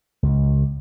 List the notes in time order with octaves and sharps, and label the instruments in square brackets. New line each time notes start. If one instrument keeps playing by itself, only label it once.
[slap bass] C#2